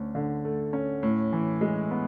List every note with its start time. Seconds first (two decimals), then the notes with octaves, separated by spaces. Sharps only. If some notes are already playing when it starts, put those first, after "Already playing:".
Already playing: D2 C#4
0.15 D3
0.45 A3
0.73 C#4
1.03 A2
1.33 E3
1.61 G#3
1.91 B3